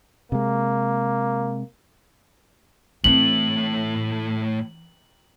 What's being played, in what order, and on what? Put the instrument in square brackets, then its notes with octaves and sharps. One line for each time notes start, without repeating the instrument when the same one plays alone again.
[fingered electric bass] C3 G#3 [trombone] A#3
[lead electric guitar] A2 A3 [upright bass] E3 C4 [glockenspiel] F#7